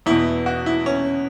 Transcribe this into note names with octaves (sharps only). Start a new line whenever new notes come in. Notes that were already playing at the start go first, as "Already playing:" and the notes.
E2 B2 E4
F#4
E4
C#4